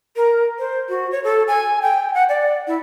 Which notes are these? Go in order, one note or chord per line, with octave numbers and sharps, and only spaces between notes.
A#4
C5
F#4
C#5
A4
G#5
G5
F#5
D5
E4